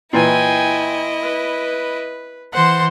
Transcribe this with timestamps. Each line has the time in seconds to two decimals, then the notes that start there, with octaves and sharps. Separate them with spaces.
0.13 A#2 E3 E4 D#5 G5 G#5
1.22 B4
2.53 E3 C5 F#5 C6